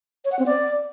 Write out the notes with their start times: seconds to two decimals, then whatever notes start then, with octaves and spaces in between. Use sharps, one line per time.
0.25 C#5
0.32 F#5
0.39 C4
0.46 D5